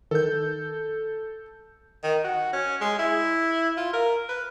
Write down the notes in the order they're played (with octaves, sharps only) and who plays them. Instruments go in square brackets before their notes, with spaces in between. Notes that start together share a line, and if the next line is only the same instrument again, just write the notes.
[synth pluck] D#3 [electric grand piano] A4 G6
[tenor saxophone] D#3
F#4
C#4
G#3
E4
F4
A#4
B4